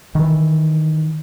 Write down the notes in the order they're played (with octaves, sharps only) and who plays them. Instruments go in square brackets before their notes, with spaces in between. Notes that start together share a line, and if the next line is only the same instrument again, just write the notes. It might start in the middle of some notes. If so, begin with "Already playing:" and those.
[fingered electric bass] D#3 E3